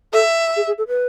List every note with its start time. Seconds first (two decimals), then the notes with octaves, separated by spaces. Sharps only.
0.13 A4 E5
0.56 G#4
0.67 G#4
0.78 A4
0.88 B4